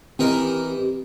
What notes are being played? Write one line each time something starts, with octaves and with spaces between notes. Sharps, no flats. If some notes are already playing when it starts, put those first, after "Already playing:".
E3 C4 D#4 G4 A#4